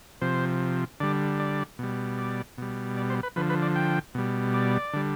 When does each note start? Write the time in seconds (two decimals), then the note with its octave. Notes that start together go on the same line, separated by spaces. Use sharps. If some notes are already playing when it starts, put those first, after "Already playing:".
0.21 C3 F3 C5
1.00 D3 G3 D5
1.40 D5
1.79 B2 G3
2.18 D5
2.58 B2 G3
2.97 D5
3.10 C5
3.23 B4
3.36 D3 F3 B4
3.50 B4
3.62 D5
3.76 G5
4.15 B2 G3
4.54 D5
4.93 D3 G3